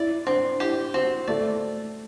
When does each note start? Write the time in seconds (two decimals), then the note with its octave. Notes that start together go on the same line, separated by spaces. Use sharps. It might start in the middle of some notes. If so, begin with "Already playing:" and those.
Already playing: E4 D5
0.27 C4 D4
0.60 E4 G4
0.94 C4 F#4
1.28 A3 D5